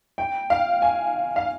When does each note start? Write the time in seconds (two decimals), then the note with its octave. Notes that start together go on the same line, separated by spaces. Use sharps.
0.18 G5
0.50 F5
0.82 G#5
1.36 F5